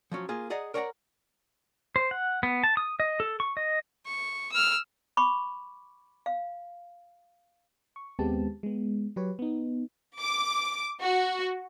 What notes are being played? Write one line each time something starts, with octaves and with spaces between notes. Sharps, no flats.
F3 F#3 C#4
A#3 F4 G#4
G#4 D5 D#5 F#5 A#5
A#4 C#5 D5 F#5 G#5 A#5
C5
F#5
B3
A5
D#6
D#5
A4
C#6
D#5
C#6
E6 F6
B5 C#6 D6
F5
C#6
D#2 G#3 B3 C4 G4 A5
G#3 B3
F#3 G4 B4 C#5
B3 D#4
D6
F#4